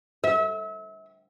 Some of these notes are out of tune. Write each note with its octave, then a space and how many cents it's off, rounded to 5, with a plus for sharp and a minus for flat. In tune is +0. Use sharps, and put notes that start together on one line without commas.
E5 -35